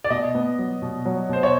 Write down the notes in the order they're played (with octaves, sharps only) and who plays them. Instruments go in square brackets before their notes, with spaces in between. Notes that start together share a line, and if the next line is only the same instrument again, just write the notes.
[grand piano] D5
[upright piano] B2 [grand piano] D#5
[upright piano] B3
F#3
B2
F#3
[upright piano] B2 [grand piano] C5
[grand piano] C#5